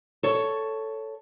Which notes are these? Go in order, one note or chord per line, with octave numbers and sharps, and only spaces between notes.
A4 C#5